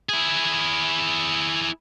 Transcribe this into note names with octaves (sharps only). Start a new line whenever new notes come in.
E4 G#4